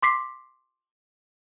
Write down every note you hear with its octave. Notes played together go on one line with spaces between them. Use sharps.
C6 D6 B6 C7